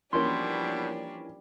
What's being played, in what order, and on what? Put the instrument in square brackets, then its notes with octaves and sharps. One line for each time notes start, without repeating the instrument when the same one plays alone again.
[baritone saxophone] B2 [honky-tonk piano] E3 A#3 C#4 [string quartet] F3 G3 D4 [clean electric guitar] C6